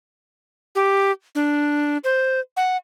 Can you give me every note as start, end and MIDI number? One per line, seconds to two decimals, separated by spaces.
0.75 1.11 67
1.35 1.97 62
2.04 2.40 72
2.57 2.77 78